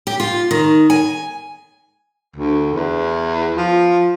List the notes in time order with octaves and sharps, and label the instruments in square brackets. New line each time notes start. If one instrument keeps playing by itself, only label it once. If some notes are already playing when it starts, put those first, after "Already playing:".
[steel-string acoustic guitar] G4
F4
D#3
G#5
[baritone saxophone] D2
E2
F3